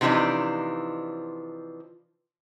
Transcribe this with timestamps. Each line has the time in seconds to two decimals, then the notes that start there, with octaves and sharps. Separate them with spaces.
0.01 C3 E3 F3 D4 D#4